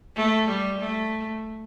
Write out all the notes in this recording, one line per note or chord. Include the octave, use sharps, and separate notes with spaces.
A3
G3
A3